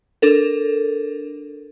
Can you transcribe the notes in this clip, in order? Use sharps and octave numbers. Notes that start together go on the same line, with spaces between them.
D4 A4 A#4